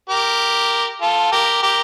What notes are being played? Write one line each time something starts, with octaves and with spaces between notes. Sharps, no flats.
G4 A#4
F4 A4
G4 A#4
G4 A#4